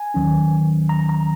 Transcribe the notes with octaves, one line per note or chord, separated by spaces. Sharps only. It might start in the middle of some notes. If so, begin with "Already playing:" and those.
Already playing: G#5
D#2 D#3 F#3 C#4
A#5
A#5